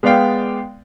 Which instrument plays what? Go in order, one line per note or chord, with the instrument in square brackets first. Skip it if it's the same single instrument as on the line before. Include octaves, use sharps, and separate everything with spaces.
[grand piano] G#3 B3 D5 F5 G5